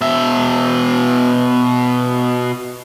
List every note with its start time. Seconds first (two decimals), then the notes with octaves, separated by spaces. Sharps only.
0.01 B2 E5